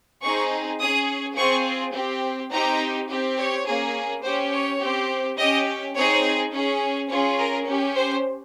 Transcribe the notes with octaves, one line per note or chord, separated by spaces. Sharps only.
C4 D#4 G#4 C#6
C#4 G#4 D#6
C4 F4 G#4 C#6
C4 G4
C4 D#4 G4 A#5
C4 G4
C#5
A#3 C#4 G#4
C#4 G4 C5
C#5
C4 G4
C#4 G4 D#5
C4 D#4 G#4 C#5
C#4 G#4
C#4 F4 G#4 C#5
A#4
C#4 G4
C5